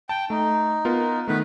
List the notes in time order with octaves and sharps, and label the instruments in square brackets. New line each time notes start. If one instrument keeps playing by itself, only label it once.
[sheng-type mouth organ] G5 [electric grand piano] A5
[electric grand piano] A3 [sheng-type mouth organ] D#4
[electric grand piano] B3 F4 A#4
[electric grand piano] D#3 A3 [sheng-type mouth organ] B3 B4